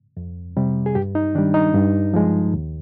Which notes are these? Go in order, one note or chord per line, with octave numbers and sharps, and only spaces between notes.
F2
C3 G3
G#4
G2 G4
D#4
D#3 G3 D4
D#4
G2
F3 G#3
D#2